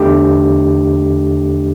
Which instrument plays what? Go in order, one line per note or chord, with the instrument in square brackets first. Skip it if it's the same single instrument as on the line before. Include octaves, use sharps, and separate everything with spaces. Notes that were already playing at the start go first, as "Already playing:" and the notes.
Already playing: [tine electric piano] E2 D3 A3 D4 G4